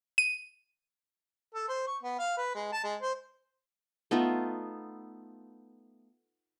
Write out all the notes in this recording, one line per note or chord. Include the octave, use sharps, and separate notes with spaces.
D#7
A4
C5
C#6
B3
F5
B4
G#3
A5
G#3
C5
A3 B3 D#4 F4